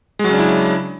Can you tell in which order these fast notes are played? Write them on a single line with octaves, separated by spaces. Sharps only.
G#3 F#3 C#3 D4 E4